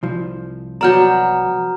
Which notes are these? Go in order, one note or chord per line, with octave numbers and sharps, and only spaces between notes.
C2 F3
F#3 B3 D5 A#5 F6 G6